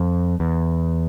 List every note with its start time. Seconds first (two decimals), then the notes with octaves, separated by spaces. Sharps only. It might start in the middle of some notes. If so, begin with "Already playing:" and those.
Already playing: F2
0.40 E2